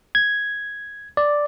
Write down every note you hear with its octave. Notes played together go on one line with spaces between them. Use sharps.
G#6
D5